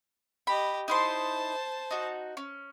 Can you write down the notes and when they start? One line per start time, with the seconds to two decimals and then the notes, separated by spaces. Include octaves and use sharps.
0.47 G4 D#5 B5
0.88 D#4 E4 C5 A5 C6
1.91 D#4 F#4
2.37 C#4